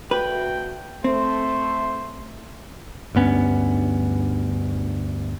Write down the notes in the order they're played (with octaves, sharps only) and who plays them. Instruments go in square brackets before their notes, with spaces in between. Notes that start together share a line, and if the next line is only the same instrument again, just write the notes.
[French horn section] D2 A3 F#4 [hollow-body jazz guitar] B4 [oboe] G5
[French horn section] A3 [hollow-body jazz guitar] C4 [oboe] C5
[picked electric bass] D2 G2 B3 C#4